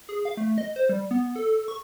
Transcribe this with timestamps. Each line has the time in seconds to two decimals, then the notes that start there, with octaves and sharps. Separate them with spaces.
0.09 G#4
0.25 F5
0.37 A3
0.58 D#5
0.76 C5
0.89 G3
1.11 B3
1.36 A4
1.68 C#6